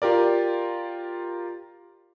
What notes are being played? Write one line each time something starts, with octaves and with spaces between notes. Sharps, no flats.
F4 G4 A#4 D5